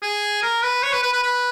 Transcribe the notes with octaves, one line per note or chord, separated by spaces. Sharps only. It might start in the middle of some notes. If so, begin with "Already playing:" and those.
G#4
A#4
B4
C#5
B4
B4
B4
B4